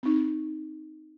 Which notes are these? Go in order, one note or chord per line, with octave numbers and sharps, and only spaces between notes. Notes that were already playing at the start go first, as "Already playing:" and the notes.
C4 D#4